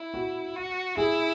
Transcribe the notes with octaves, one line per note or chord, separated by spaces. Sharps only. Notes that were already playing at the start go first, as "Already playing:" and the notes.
Already playing: E4
F#4
F#4
E4 G#4